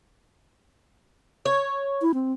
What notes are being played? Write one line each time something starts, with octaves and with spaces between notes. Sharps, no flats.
C#5
E4
C4